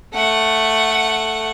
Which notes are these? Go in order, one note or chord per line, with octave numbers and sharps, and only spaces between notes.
A3 F#5